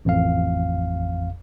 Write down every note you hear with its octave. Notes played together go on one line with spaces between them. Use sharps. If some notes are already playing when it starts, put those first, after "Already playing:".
A1 F2 F5